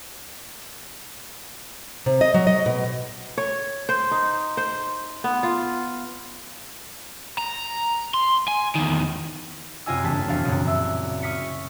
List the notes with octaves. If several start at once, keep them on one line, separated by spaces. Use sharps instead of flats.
C3
D#5
F#3
D#5
B2
C#5
C5
D#4
C5
B3
F4
A#5
C6
G#5
E2 D#3
F#2 C3 F4 D#5 G#5 E6
E1 G2 C#3 A#3 A5 B6
E1 F2 B2 F5 A6
C2 F#2 A#2 C#3
E5 E6
C#6 D#6 F6 B6 C#7